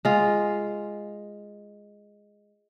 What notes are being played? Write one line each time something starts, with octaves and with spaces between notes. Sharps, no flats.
G#3 F4